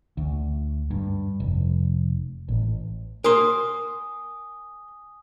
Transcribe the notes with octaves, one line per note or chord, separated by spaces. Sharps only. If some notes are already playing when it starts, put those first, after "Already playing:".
D2
G2
F1
A1
A#4 G#5 C6 D#6